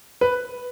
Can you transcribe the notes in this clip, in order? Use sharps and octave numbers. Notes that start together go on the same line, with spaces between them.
B4